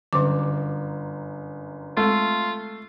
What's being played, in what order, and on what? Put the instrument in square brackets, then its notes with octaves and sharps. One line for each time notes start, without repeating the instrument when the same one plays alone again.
[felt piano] G1 F#2 [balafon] D3 D6
[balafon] G#3 C4 [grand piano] A3 [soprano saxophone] F4